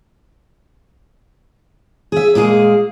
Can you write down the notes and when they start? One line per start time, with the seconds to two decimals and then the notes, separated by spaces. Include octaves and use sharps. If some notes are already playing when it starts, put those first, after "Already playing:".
2.12 G#4 E5
2.35 A#2 G#3 A#3 G#4